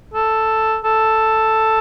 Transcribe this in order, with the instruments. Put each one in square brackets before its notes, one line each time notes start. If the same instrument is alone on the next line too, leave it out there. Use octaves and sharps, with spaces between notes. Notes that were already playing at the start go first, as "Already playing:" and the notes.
[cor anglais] A4
A4